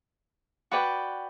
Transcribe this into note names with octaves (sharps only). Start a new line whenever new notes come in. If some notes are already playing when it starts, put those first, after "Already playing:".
F#4 B4 D5 G5